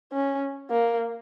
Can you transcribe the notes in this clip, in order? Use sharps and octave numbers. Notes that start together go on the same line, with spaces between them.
C#4
A#3